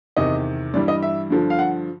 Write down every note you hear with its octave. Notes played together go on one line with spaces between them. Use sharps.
E2 C3 D#3 D#5
G2 E3 G3 D5
D#5
E5
G2 D3 F3
F5
F#5